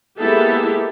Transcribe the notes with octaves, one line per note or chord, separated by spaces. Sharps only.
G#3 A#3 B3 E4 G4 A4